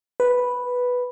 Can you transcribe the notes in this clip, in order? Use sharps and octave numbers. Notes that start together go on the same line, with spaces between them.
B4